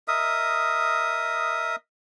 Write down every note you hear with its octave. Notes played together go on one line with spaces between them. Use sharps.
A#4 D#5 E5 D#6